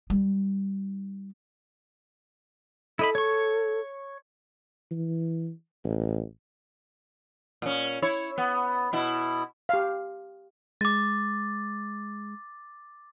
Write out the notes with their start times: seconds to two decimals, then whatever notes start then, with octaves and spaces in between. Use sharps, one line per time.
0.10 G3 D#4
2.99 E4 A4 D#5 B5
3.15 C#5 C#6
4.91 E3
5.84 A1
7.62 A#2 C#4
8.02 E4 C#5
8.38 B3
8.93 B2 E4
9.69 G4 F5
10.81 G#3 D6 A6